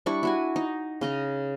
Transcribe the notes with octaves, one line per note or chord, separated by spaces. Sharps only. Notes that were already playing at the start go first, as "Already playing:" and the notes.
G3 D4 E4 C#6
E4 F#4 G#5
D#4
C#3 D#5 A#5